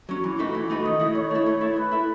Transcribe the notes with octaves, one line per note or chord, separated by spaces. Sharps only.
F#3 C#4
E3
A3 D#4 F#4 B4
E3
A3 D#4 F#4 B4
D#3 D#5
A3 E4
D#3 C#5
A3 E4
A3
E4 A4 E5
A3 B4
E4 A4 E5